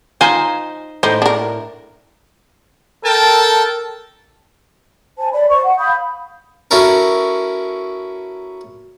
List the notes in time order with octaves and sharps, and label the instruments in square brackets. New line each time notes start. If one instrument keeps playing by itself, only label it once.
[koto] D#4 C5 [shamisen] F4 G#5
[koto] A2 [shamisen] D#4 C5
[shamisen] D4 A#4
[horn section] A4 A#4 G5 A5
[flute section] C5 G#5 A5
C#5 D5 B5
C5 D5 C#6
F#5
F5 B5 D#6 G6
[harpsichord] C#4 E4 F#4 A4 A#4